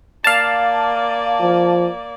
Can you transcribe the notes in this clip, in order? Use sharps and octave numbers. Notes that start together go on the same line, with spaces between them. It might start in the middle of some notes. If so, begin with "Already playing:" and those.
A#3 D5 F5 A5
F3